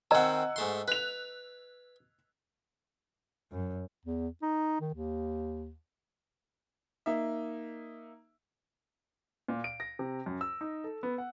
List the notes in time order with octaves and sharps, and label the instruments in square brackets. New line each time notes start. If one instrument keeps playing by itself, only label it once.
[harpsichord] D#3 C4 [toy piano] D#5 A#5 [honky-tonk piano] F#5 G#5 E6
[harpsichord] G#2 A3 C6
[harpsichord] B4 [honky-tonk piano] F#6 F7
[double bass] F#2
[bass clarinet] E2
D#4
D#3
D#2
[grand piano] A#3 D#4 E5
A#2
D7
A#6
C3
F#2
E6
D#4
A4
B3
F#5